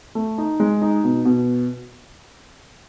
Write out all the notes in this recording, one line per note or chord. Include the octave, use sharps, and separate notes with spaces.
A3
D#4
G#3
D#4
B2
B2